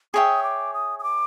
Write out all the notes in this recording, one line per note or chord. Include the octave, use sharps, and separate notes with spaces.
G#4 C#5 E5 G5 D#6
D6
D#6
D#6
D6